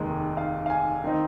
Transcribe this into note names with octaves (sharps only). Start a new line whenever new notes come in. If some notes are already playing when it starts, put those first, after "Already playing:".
Already playing: F1 D#2 D#3 G#3
F5
F5
G#5
D#3 C4 D#4